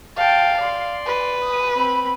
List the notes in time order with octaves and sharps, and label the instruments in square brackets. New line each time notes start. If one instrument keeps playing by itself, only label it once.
[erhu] F5 [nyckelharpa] G5 A5
[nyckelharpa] D5 C6
[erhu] B4
[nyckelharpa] D#6
C4 B5